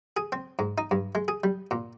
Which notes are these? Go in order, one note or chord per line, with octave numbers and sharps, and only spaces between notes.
G#4
C4
G#2
D#4
G2
G#3
G#4
G3
A#2